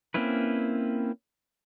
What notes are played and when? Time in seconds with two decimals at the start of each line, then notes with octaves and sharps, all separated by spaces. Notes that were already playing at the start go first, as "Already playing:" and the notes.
0.14 A#3 C4 C#4 E4 B4